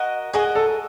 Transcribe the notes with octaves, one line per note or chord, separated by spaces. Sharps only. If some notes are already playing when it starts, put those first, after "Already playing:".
Already playing: F#4 A#4 D#5
F#4 G#4 A#4 D#5
A4